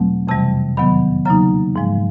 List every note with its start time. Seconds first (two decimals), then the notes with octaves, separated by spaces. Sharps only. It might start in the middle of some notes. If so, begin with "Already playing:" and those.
Already playing: E2 B2 F#3 A3 C4
0.27 F2 C3 E3 G3 A5
0.77 E2 C3 D#3 F#3 B3 B5
1.25 C#3 F#3 A#3 D#4 A#5
1.76 G#2 F3 G#3